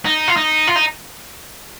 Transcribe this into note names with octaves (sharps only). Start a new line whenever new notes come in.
D#4
F4
D#4
F4
D#4